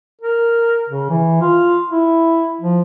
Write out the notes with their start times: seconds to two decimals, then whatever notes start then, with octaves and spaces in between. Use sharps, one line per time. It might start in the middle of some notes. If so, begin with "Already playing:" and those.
0.21 A#4
0.89 C#3
1.10 E3
1.41 F4
1.90 E4
2.61 F3